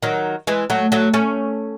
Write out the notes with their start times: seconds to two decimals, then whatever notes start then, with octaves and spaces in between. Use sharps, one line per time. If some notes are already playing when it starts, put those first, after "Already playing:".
0.03 D#3 F#3
0.47 E3 G#3
0.70 F#3 A3
0.92 F#3 A3
1.14 A3 C#4